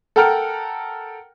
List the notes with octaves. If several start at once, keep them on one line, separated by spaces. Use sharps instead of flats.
A4 A#4 F#5 G5 A#5 F6